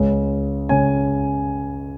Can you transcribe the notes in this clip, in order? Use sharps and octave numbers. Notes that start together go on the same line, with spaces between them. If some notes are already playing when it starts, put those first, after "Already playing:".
Already playing: C#2 C#3 G#3 C#4
C#2 C#3 G#3 C#4 G#5